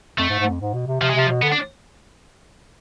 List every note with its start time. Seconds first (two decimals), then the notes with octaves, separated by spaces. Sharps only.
0.18 F2 A3
0.29 G#2
0.39 G#2
0.50 F2
0.60 G#2
0.73 B2
0.87 C3
1.01 C3 F3
1.10 G#3
1.15 C3 F3
1.29 B2
1.42 D3 B3
1.52 D4